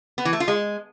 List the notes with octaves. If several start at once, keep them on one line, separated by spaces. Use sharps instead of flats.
B3
E3
A3
F4
G#3